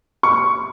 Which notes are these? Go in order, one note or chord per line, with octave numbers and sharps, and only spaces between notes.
C#6